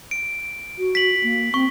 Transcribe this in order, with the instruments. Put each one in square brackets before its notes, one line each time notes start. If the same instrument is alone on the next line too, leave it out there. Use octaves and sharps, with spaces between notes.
[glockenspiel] D7
[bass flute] F#4
[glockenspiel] B6 F#7
[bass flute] A#3
[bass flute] C4 [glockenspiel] C#6